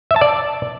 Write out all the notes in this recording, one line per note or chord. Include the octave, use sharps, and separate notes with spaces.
E5
A5
D5